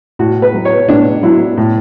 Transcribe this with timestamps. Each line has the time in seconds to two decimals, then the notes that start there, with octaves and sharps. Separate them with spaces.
0.19 A2 F#4
0.42 B4
0.54 F#3
0.65 C#5
0.88 A2 D4
1.23 F#3 E4
1.57 A2